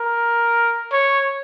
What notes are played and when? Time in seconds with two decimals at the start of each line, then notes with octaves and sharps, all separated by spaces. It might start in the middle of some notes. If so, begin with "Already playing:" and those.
Already playing: A#4
0.92 C#5